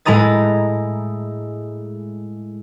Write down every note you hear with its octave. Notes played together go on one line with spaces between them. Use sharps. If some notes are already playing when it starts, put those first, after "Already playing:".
A2 G#3 E4 A#5 D#6 A6